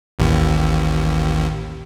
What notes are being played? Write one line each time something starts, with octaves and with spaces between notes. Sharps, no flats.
A1 D#2